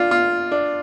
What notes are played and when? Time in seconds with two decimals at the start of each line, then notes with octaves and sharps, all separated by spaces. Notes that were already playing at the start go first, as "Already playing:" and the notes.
Already playing: D4 F4
0.11 F4
0.52 D4